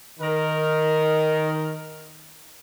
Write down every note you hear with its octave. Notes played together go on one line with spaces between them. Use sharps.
D#3 A#4